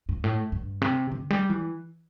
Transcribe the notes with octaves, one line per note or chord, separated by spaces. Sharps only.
G2
A2
G2
C3
D3
G3
E3